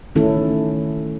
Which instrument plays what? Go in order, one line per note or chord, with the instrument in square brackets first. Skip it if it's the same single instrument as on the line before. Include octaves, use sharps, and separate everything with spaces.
[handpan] D#3 A3 C#4 E4 A4